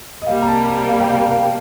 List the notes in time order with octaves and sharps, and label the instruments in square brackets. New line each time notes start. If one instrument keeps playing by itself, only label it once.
[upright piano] D#5
[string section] C2 C3 G3 A#3 [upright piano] F5
[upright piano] A#5
A5
A#5
F5
G5
F5
G5
F5
G5